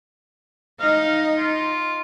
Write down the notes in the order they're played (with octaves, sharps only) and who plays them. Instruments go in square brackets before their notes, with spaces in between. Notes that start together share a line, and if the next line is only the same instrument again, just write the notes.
[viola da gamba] D#4 [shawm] F5
[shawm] F4